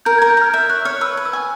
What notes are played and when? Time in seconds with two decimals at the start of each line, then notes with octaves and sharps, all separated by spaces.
0.05 A#4 G6
0.18 A#4 G#6
0.30 G6
0.37 A#4 F6
0.54 E5 G6
0.70 C#5 F#6
0.85 C#5 F6
1.01 B4 E6
1.17 B4
1.25 E6
1.33 G#5